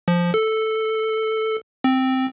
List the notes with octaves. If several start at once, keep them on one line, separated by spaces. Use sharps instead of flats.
F3
A4
C4